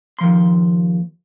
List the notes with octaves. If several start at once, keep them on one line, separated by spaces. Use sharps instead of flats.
D#2 F3 C6